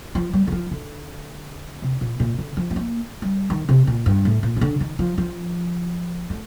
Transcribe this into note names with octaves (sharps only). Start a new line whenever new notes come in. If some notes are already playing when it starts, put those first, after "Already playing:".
F3
G3
D#3
F3
D3
C3
A#2
A#2
D3
F3
A3
A#3
G3
D#3
C3
A#2
G2
A2
A#2
C3
D3
D#3
F3
F3
A3